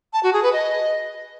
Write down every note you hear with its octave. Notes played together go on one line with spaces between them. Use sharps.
A5
F#4
G#4
B4
D#5